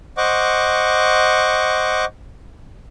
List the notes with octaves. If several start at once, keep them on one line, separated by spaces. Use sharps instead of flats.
C5 D#5 F#5 C#6 D6